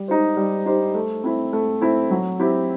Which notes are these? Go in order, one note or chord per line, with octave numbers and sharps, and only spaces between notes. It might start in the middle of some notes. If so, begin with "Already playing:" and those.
Already playing: G3
D#4 G4 C5
G3
D#4 G4 C5
A3
C4 E4
A3
C4 E4
F#3
C4 E4 G4